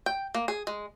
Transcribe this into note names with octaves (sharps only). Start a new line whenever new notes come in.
G5
A#3
G#4
G#3